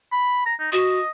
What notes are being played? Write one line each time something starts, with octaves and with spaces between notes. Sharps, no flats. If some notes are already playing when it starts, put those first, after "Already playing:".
B5
A#5
D#4
F#4 D#5